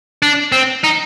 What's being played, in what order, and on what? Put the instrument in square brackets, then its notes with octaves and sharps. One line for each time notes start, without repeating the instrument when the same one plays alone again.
[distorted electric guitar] D4
C4
D#4